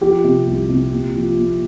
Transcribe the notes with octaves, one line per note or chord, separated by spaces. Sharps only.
F3 G4
C3
C2
C3
A#2
F3
A#2